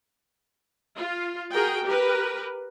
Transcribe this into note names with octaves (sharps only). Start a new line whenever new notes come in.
F4
F#4 G#4 A#4 G5
G4 A#4 B4